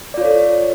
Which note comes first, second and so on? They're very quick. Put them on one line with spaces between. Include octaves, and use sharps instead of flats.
D5 F4 C#5 A4